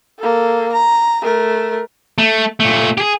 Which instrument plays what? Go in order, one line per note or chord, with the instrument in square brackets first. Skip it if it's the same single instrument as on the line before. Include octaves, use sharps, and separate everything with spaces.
[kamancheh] A#3 A4
A#5
A3 A#4
[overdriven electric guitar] A3
A#2 A3
G4 G#4